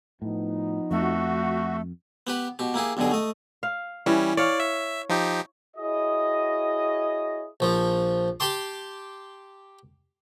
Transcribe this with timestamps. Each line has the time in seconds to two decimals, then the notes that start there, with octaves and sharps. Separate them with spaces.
0.22 A2 F3 B3 D#4
0.91 F2 A3 F#4
2.27 B3 G4 B4
2.59 B2 G4
2.74 A#3 E4 G4 G#4
2.97 B1 G2 B2 D3 G#4
3.11 A3 D#5
3.63 F5
4.06 E3 G3 C#4
4.37 C#5 D5 F5
4.60 E5
5.09 F3 D#4 G4
5.76 E4 F#4 G#4 C#5 D#5
7.60 A#1 F3
8.40 G4 A5 C6 D6